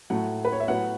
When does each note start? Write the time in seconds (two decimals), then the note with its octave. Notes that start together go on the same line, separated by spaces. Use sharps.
0.10 A2 F#3 A3 F#5
0.45 B4
0.52 C#5
0.60 E5
0.68 A2 F#3 B3 F#5